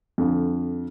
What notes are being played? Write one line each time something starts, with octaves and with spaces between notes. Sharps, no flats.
F2 D3